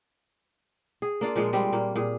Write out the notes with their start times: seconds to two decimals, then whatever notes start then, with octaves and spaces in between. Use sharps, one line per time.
1.02 G#4
1.21 A#3 D4 F4 D5
1.36 A#2 F3 G#3
1.53 G3 G#3 C4
1.72 A#2 A#3
1.96 A#2 G#4